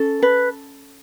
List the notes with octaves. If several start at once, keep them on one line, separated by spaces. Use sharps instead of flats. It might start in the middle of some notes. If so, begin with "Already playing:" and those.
Already playing: C#4 A4
B4